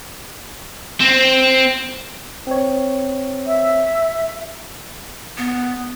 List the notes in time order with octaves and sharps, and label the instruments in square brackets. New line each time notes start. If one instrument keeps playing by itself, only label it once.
[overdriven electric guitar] C4 C5
[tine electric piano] C4 C#5
[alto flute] E5
[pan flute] B3